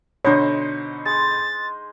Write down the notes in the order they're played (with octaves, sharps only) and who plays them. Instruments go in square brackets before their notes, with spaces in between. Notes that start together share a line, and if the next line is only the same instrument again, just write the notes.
[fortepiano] B2 D3 [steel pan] D4 C#5 [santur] D#4 C5 D#5
[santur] G#3 [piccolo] A6